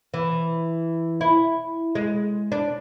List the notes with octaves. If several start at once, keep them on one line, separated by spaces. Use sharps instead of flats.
E3
E4
G#3
D4